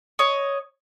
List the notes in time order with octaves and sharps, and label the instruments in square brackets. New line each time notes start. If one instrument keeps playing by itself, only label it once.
[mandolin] C#5 D#5